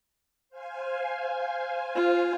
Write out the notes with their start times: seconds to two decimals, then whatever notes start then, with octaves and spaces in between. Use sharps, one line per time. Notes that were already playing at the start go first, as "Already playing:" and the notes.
0.49 C5 F5 G#5
1.95 F4